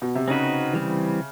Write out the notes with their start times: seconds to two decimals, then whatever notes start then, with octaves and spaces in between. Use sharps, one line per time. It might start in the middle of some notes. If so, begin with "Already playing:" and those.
0.02 B2
0.15 C3
0.28 C#3 C4 D#4 F#4 B4
0.73 E3 G3 C4